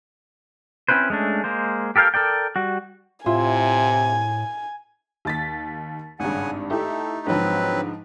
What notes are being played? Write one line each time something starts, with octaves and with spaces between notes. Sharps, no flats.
C4 C#4 E4 B4 C5
G#3 A3 C#4 D4
G#3 A#3 C5
G4 A4 A#4 F5 G5
A4 A#4 D5 G5
G3 F#4
A2 C3 E4 F4 G#5
D#2 A6 B6
G#1 G2 C#3 F#5 G#5
A3 D#4 E4 G4 A4
G#2 D3 F3 F#3 C4 B4